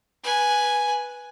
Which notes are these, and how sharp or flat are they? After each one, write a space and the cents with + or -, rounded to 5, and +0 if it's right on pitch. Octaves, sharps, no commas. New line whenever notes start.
B4 -10 G#5 +0